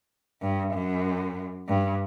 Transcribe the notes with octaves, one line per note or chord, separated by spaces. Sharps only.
G2
F#2
G2